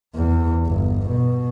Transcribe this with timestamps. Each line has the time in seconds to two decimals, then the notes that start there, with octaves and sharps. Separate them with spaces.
0.16 E2
0.67 G1
1.10 B2